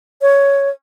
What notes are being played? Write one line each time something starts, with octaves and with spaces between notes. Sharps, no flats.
C#5